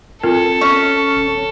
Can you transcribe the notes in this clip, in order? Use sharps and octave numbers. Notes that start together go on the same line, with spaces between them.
C4 F4 A4 A#4
C#4
D#1